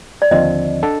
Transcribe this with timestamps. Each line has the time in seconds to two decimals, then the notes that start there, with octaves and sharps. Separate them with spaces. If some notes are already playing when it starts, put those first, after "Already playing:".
0.22 D5
0.31 D#2 D3 F3 C4 D#5
0.83 D4 A4